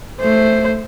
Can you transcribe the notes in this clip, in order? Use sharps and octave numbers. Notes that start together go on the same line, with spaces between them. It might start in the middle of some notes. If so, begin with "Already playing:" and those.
A3 C5